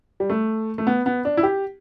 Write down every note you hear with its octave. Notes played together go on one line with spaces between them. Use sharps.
G3
A3
A3
B3
B3
D4
E4
G4